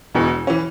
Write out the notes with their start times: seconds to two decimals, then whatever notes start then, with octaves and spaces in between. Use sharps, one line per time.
0.15 E1 E2 B2
0.47 E3 C#4